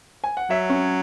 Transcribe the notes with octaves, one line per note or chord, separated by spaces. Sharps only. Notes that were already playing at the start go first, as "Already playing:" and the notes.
G#5
F#5
F#3 E5
C#4